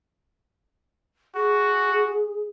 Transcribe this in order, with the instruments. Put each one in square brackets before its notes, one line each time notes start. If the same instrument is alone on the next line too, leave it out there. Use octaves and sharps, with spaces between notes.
[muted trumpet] F#4 [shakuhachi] G#4